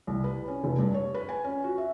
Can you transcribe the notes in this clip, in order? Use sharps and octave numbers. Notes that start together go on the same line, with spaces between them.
C2
B4
C#4
F1
G2
C#5
B4
G#5
C#4
F#4
E5